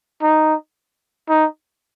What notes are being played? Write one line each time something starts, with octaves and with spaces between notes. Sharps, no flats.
D#4
D#4